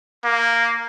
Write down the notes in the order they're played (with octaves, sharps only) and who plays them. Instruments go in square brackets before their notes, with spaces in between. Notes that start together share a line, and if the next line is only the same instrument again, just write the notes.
[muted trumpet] A#3